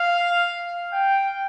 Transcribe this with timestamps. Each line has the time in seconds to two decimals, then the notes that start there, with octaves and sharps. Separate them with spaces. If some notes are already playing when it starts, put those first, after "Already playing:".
Already playing: F5
0.93 G5